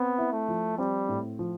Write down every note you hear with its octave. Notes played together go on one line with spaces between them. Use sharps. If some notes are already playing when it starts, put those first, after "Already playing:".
Already playing: B3 C4
E4
A3
F3
G3 C4
A2
F3